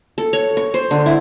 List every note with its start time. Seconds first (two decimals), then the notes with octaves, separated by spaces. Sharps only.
0.18 A4
0.33 C#5
0.57 C#6
0.74 C5
0.91 D3
1.06 E4